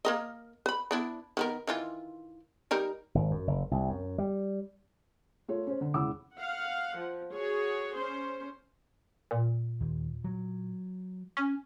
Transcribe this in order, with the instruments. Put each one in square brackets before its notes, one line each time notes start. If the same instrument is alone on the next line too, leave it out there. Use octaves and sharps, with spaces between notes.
[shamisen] A#3 A#4 D#5
B4 B5
B3 D4 E4
D#3 B3 A#4
D#3 E3 F4
G3 D#4 A#4
[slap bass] G#1
F#2
F#1
C2
F#2
G3
[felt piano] A3 F4 C#5
C#4 C5
D3
E1 C#3 E4 F#5 D6 E6
[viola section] F5 F#5
F3
F#4 G#4 C#5
C#4 C5
[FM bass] A#2
[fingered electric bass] D#2
F#3
[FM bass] C#4